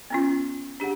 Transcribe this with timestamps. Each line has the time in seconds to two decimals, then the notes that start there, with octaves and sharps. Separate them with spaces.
0.10 B3 C#4 F4
0.80 D4 G4 G#4 F#5